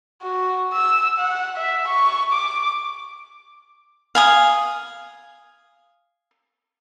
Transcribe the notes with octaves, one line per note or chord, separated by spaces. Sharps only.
F#4
E6
F#5
E5
C#6
D6
F5 G#5 D#6